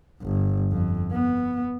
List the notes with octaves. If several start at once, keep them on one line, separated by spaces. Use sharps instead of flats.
G1
F2
B3